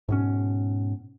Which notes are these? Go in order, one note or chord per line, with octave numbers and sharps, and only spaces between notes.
G#2 B2 C#4